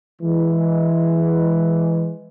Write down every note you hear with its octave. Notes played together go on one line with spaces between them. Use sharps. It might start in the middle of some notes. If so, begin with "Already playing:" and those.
E3 G#3